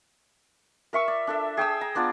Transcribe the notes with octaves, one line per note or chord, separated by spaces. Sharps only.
A#4 E5 C#6 E6
D5
D4 A4 E5
G#4 G5 D#6 E6
A#5
B3 D4 F4 D5